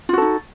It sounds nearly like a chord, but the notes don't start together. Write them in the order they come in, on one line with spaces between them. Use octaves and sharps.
F4 F#4 A4 D#4